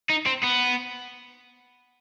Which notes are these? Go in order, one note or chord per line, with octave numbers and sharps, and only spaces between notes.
D#4
C4
B3